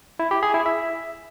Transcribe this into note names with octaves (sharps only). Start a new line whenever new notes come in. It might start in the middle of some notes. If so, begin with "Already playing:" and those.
E4
G4
G#4
E4
E5